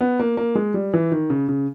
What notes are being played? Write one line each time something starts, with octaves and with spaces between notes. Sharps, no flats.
B3
A#3
A#3
G#3
G3
E3
D#3
C#3
C#3